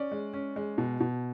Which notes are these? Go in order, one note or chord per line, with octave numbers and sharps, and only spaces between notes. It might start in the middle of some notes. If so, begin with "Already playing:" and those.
Already playing: C#4 D5
G#3
C#4
G#3
B2
B2